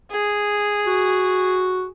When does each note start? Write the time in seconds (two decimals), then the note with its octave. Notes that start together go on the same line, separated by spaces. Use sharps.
0.12 G#4
0.87 F#4